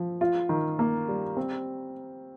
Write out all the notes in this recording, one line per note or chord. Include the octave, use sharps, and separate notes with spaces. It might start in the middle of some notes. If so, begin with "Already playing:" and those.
Already playing: F3
F4
D#3
A#3
G3
C4